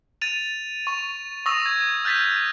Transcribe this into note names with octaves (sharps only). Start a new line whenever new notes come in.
A6 D#7 F7
C#6 F7
C#6 D#6 E6 A#6 F7
G#6
F6 G6 A6 B6